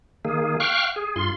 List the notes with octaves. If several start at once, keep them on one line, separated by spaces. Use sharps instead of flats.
D#3 A#3 G#4
F5 G5 C#6 F6 F#6
G#4
G2 F4 C6